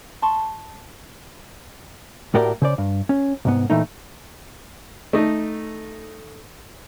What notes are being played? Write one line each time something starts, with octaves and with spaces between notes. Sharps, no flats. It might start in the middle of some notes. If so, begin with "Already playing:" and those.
A5 C6 C#6
A2 F#4 G4 A#4 D5
C#3 C5 D5
G2
C#4
C2 G#2 B3
A#2 E3 A3 D#4
A3 D#4